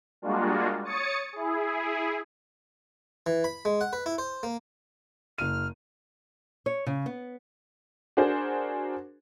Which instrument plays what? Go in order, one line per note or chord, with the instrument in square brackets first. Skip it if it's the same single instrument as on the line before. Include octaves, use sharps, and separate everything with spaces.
[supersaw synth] G3 G#3 A#3 D4 F4 F#4
C#5 D#6 A6 C#7
E4 G#4
[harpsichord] E3
B5
G#3
F#5
B4
E4
C5
A#3
[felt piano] F#1 D#7 [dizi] F6
[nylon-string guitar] C#5
C#3
B3
[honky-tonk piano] D4 F#4 G#4 A#4 C5